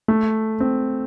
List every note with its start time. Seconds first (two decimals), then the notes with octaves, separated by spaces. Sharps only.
0.08 A3
0.60 C4